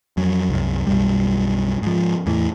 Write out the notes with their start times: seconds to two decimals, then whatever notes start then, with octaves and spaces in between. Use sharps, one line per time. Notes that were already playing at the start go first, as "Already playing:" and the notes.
0.17 F2 F#3
0.49 C2 F#2
0.87 B1 F#2 G3
1.82 G#2 F3
2.26 E2 A2 E3